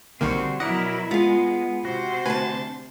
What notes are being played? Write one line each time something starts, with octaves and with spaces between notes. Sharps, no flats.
B1 D3 D#3 G3 A#3 C4 F#4
B2 F#3 E4 A#4 D5 D#5 F#5
G#3 B3 F4 G#4
C3 F#4 C5
D2 B4 G#5 A5